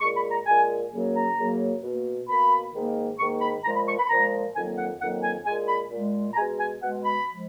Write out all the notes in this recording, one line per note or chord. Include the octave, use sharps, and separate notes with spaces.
A#2 G#3 C#6
B5
A#5
A#2 G#3 G#5
F#2 C#3 F#3 A#3
A#5
F#2 C#3 F#3 A#3
B2 A#3
B2 A#3 B5
G#2 D#3 A#3
G#2 D#3 A#3 C#6
B5
A#2 F3 G#3 A#5
B5
C#6
B5
A#2 F3 G#3 A#5
F2 D#3 F#3 A#3 G#5
F#5
F2 D#3 F#3 A#3 F#5
G#5
A#2 G#3 G#5
B5
A#2 G#3
A#5
B2 G#3 G#5
G#5
B2 G#3 F#5
B5
F3 G#3